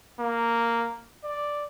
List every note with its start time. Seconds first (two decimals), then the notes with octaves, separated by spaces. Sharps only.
0.20 A#3
1.24 D5